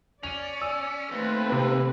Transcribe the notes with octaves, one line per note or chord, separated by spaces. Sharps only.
C#4 D5 D#7 F7
E6
D#2 A3 C4 B4
C3